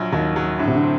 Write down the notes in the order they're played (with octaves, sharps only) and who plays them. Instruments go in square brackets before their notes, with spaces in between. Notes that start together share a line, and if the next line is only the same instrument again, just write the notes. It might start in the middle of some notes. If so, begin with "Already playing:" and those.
Already playing: [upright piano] A#1 F#3
[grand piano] D#2 D#3 [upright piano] F#3
[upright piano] F#3
[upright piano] A2 [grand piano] D3
[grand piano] C3
D3
[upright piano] C4